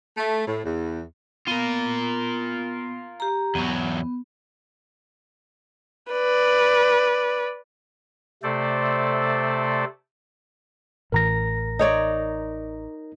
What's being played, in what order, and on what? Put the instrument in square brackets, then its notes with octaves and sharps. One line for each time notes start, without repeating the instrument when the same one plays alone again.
[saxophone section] A3
A2
E2
[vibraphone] B3 [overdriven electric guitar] F4 A#4
[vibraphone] G4 A#5
[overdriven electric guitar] E2 F#3 [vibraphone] B3
[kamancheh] B4 D5
[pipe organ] C3 A3 A4 C5 D5
[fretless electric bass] A1 A2 E3 [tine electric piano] A#4 A#5 A#6
[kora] D#4 C#5 D5